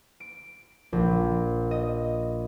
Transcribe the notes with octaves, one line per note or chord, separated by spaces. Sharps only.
D7
A#1
D#5